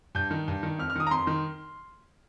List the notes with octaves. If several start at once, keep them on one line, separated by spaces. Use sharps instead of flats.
G2 G6
D#3
G2
D#3
F2 F6
F6
D#3 D#6
A#5
F2 C6
D#3